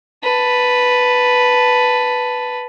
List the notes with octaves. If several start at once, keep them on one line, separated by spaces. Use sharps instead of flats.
B4 A5